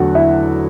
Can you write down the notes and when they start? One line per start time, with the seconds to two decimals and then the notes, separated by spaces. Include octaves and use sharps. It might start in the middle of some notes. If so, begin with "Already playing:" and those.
Already playing: E2 D3 F#3 A3 F#4 A4 F#5
0.15 E4 E5